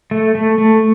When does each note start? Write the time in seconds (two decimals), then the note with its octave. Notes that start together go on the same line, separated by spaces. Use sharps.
0.11 A3
0.35 A3
0.58 A3